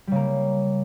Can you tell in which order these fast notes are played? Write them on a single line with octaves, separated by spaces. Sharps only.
G3 C#3 A#3